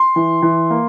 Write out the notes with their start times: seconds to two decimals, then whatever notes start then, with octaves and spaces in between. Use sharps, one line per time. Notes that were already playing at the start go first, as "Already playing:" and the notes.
Already playing: C6
0.16 E3
0.42 E3
0.70 A#3